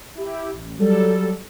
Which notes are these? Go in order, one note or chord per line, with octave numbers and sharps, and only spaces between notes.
E4 G4
A1
F#3 G3 A4